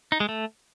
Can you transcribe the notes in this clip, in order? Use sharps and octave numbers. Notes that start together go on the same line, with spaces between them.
D#4
G#3
A3